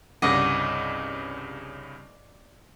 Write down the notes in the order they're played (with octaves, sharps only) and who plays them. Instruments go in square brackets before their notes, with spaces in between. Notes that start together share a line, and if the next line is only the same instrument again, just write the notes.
[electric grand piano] C2 G2 C#3 [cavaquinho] D5 D#5 F#5